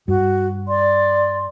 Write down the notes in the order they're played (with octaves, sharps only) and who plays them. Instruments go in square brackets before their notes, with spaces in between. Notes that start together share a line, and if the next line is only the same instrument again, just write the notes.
[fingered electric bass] G2 [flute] F#4
[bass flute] D5 [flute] C6